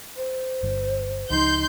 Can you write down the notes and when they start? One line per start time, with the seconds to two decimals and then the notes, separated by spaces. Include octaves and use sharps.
0.16 C5
0.63 G1 G2 D3
1.30 C#2 C#3 F3 D#4 C6 G6